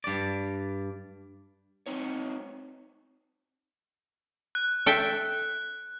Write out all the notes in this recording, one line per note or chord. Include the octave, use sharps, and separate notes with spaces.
G2 D5
C4 D#4 C#5
F#6
A4 E5 G5